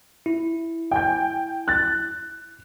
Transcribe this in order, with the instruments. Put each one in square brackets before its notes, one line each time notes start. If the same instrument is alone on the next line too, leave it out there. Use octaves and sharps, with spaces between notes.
[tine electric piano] E4
[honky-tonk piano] G5 G#5 G6
F#6 A6